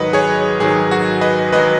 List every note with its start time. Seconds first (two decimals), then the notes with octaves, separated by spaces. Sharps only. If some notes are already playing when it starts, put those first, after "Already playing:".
Already playing: G#2 D#3 F#3 B4 D#5 F#5
0.13 G#4 C#5
0.60 G#2 D#3 F#3 G#4
0.91 F#4
1.21 B4 D#5
1.52 G#2 D#3 F#3 B4 D#5